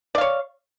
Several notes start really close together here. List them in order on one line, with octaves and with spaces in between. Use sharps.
D5 F5 C#5